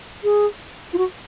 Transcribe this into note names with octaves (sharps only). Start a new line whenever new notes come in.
G#4
F4
F#4